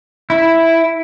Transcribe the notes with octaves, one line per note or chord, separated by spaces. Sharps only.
E4